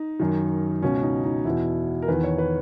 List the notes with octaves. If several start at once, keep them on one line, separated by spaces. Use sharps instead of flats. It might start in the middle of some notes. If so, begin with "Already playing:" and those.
Already playing: D#4
F#2 D#3
C#2 B2 C#4
D#4
D#4
E2 B2 E4
A#4
E2 D#3 B4
C#5
B4